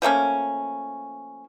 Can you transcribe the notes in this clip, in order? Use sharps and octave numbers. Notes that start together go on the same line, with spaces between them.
F3 A3 A#3 C#4